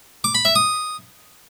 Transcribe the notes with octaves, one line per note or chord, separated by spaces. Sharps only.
D6
B5
E5
D#6